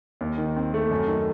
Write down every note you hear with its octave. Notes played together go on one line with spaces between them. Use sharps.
D#2
D#3
C4
A3
F#2
D#3